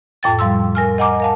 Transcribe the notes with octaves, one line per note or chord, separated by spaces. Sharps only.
F2 A2 G5 A6
F3 G3 C6 E6
A#4 G#5 F6
D#5 F#5 G#5 A#5 D6
A#4 F5 A5